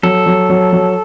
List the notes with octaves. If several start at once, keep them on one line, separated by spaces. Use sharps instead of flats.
F#3 A4
F#3
F#3
F#3